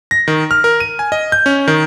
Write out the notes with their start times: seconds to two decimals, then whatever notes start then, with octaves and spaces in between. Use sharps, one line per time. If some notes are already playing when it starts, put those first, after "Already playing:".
0.11 A#6
0.28 D#3
0.51 F6
0.64 A#4
0.80 D#7
0.99 G#5
1.12 D#5
1.32 G6
1.46 C#4
1.68 D#3